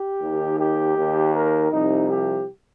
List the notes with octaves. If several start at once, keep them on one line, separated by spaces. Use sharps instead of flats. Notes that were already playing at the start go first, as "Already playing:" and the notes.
Already playing: G4
D#2 D#3
G4
D#2 D#3
A#4
C2 C3 F3 D#4
G4